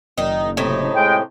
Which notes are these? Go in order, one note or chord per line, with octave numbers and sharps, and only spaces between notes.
F#1 D#3 D#4
A2 C3 D#4
G#3 G5